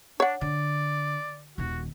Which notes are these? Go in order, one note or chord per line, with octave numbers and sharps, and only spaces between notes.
D4 C#5 F#5
D3 D5
D#1 D#3 F#4